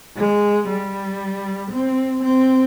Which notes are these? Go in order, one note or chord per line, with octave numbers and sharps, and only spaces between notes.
G#3
G3
C4
C4